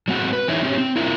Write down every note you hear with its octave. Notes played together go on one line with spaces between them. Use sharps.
F#3 G#3 A3 C4 F#4 F#5
B4
E3 D#4 E4 G#4 C#5 E5
C4 C#4 G4
C4
E4 F4 A#4 E5